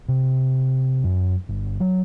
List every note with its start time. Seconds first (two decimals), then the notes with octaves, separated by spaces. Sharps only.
0.08 C3
1.04 F#2
1.49 G1
1.80 F#3